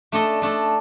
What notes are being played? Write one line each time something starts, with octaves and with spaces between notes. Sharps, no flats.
A3 D4 A4 D#5
A3 D4 A4 D#5